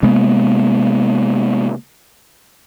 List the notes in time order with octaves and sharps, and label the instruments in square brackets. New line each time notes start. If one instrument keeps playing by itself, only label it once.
[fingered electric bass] C3 G#3 A#3 B3